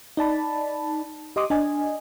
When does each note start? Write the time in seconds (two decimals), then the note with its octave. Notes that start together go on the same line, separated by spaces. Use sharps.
0.17 D#4 D5 A5 B5
1.36 G4 D#5 C6 D6 D#6
1.50 D4 D#5 G#5